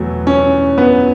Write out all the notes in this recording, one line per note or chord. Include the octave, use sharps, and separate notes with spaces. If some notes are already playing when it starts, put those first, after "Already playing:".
Already playing: E2 B2 F#3 A3
C#4
B3